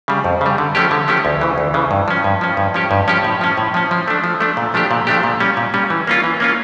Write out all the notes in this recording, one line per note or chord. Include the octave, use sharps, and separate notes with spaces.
C#3 G3
F2
C#3 G3
D3
F3 A3 C#4 G4
D3
F3 A3 C#4 G4
D2
C#3 E3
D2
C#3 E3
G2
F3 C#4
G2
F3 C#4
G2
F3 C#4 G4
G2
F3 C#4 G4
A2
F3 C#4
A2
F3 C#4
F3
A3 D4
F3
A3 D4
A#2
F3 A3 D4 G4
A#2
F3 A3 D4 G4
A#2
G3 C#4
A#2
G3 C#4
E3
A#3 C#4 F4
E3
A#3 C#4 F4